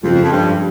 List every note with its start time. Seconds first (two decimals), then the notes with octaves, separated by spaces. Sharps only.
0.03 F2 C#3 F3 G#3
0.23 F2
0.31 G2